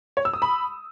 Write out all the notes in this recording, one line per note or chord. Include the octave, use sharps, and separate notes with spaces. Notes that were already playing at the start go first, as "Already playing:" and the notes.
C#5
E6
D#6
B5